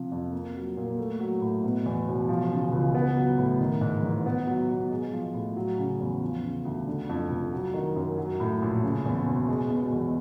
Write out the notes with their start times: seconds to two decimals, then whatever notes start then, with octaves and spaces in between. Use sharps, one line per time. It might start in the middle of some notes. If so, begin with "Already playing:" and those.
Already playing: C3 F3
0.12 F2
0.32 A#3
0.55 F#3
0.77 A#2
0.98 A3
1.20 F#3
1.41 A2
1.64 B2
1.86 E2
2.08 E1
2.29 F3
2.51 C#3
2.72 C#2
2.95 B3
3.16 F#3
3.38 A2
3.61 D#3
3.81 G#2
4.03 A1
4.26 B3
4.47 F#3
4.69 B2
4.91 G#3
5.13 F3
5.34 A2
5.56 F#3
5.78 C#3
6.00 E2
6.22 F3
6.44 C#3
6.65 D2
6.87 D3
7.09 F2
7.31 F1
7.53 F#3
7.74 D#3
7.96 F#2
8.18 F#3
8.40 A2
8.62 A#1
8.83 C#3
9.06 E2
9.27 E1
9.48 G#3
9.70 B2
9.93 E2